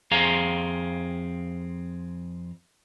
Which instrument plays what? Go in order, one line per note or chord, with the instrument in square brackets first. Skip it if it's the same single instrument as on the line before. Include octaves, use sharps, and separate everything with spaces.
[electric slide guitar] F2 C4 G#4 F5 A#5